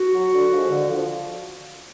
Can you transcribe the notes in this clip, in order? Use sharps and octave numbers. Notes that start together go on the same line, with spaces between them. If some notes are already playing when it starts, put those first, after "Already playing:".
Already playing: F#4
F#3
D3
F3 G#3
D3
F3